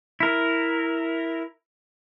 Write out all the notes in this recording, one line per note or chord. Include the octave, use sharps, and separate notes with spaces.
E4 A#4